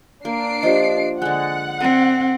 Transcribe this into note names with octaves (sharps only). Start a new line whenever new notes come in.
A#3 D4 C7 D7
F3 G4 C5 D#5
D3 G#3 F#5 F#6
C4 A4 E5